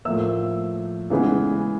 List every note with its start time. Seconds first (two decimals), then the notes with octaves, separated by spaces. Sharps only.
0.05 A2 F3 A#3 E5 E6
1.10 C#3 E3 G#3 B3